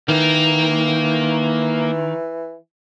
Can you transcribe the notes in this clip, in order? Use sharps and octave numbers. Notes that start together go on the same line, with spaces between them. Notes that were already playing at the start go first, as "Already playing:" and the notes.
D#3 E3 A#3 A#4